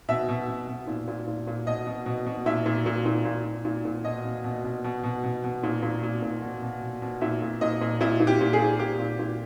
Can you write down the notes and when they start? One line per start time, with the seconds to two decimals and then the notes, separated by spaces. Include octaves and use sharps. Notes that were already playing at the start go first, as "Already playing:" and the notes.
0.09 B2 E5
0.29 B2
0.48 B2
0.68 B2
0.87 A#2
1.07 A#2
1.27 A#2
1.47 A#2
1.67 B2 D#5
1.87 B2
2.06 B2
2.26 B2
2.46 A#2 E5
2.66 A#2
2.86 A#2
3.06 A#2
3.25 A#2
3.45 A#2
3.65 A#2
3.85 A#2
4.04 B2 D#5
4.25 B2
4.44 B2
4.64 B2
4.84 B2
5.03 B2
5.24 B2
5.44 B2
5.63 A#2
5.82 A#2
6.03 A#2
6.22 A#2
6.42 B2
6.62 B2
6.81 B2
7.02 B2
7.21 A#2 E5
7.42 A#2
7.61 A#2 D#5
7.81 A#2
8.01 A#2 E4
8.20 A#2
8.27 G4
8.41 A#2
8.53 G#4
8.60 A#2
8.79 A#2 G4
9.00 A#2
9.19 A#2